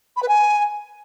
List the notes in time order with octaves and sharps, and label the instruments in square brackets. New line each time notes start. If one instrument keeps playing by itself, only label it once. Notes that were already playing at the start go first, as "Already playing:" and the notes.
[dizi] B5
B4
G#5